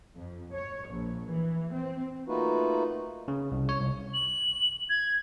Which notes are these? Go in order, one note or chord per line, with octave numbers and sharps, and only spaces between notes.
F2
C#5
A#1
E3
C4
A3 A#3 D#4 F4 F#4 B4
C#3
C2
C#5
C2
F#7
G#6